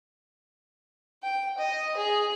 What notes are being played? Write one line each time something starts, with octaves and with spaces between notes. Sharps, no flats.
G5
D#5
G#4